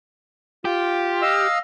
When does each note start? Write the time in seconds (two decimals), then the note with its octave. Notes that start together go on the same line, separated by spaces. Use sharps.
0.65 F4 G4
1.22 D#5 F5 E6